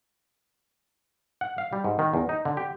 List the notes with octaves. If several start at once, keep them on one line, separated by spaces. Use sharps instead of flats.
F#5
F5
G3
G#2
D#3
E2
D#4
D3
G4